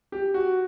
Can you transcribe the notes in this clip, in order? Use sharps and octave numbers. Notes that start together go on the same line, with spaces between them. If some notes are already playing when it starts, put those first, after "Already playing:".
G4
F#4